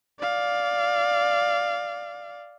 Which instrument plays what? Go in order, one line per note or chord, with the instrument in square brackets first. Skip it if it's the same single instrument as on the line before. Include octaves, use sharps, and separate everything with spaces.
[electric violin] D5 F5